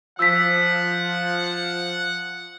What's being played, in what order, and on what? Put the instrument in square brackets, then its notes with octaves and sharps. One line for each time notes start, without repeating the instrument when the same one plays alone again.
[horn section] F3 [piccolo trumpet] F#5 [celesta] E6 B6